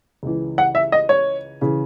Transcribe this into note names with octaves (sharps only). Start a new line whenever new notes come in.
C#2 C#3 E3
F#5
E5
D#5
C#5
C#3 E3